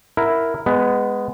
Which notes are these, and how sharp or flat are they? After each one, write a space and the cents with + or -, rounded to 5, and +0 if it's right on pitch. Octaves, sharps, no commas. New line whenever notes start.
E4 +0 A#4 +0 F#5 -5
G#3 -10 B3 +10